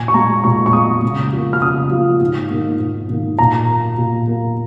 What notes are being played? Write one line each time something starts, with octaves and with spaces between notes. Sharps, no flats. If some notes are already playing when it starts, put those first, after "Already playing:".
Already playing: A#2 G#5
C#6
G#3 A#5
A#2 C#6
C#6
G#3 D#6
C#3
F3 A#3
F6
C#3 D#6
F3 A#3
G#2
D#3 A#3
G#2
D#3 A#3
A#2 A#5
A#3
A#2
A#3